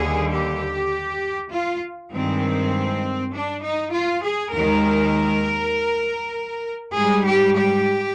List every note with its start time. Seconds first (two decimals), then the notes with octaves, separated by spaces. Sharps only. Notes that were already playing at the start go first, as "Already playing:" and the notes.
Already playing: D#2 D3 G3 G#4
0.33 G4
1.53 F4
2.13 G2 D#3 G#3 C4
3.34 D4
3.64 D#4
3.95 F4
4.25 G#4
4.54 D#2 D#3 G#3 A#4
6.96 G#2 G3 G#4
7.27 G4
7.57 G4